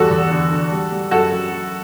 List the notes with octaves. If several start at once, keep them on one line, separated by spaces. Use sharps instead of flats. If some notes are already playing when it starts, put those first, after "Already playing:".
Already playing: E2 G3 F#4 A4
E2
D3
D3
G3
G3
F#2 F#4 A4
F#3
F#3